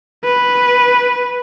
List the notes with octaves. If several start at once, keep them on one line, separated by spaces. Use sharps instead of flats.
B4